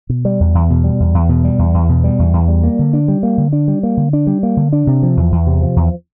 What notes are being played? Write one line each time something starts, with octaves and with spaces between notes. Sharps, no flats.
B2
G3
E2
E2
B2
G3
E2
E2
B2
G3
E2
E2
B2
G3
E2
E2
G3
A#3
D3
D4
G3
A#3
D3
D4
G3
A#3
D3
D4
G3
A#3
D3
D4
C3
F3
E2
E2
C3
F3
E2